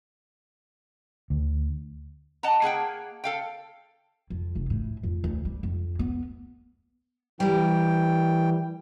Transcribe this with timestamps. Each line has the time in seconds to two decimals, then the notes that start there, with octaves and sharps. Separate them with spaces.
1.30 D2
2.43 D#5 F#5 A5 A#5
2.62 A#3 G#4 F#5 G5
3.24 A4 F5 G5
4.30 F2
4.56 F1
4.70 A2
5.03 F2
5.24 D2
5.45 G3
5.63 F2
5.99 B3
7.40 E3 G3 A#4 G5